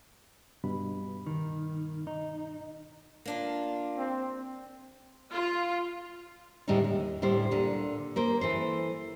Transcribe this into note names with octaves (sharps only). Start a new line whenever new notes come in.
G2 B2 B5
D#3
D#4
A#3 D4 F4
C4
F4
D2 A2 D3 G3 G#3 D#4
D#2
D2 A2 G3 C5
A#2 D3
A#3 A#4 C5
E3 A4 C5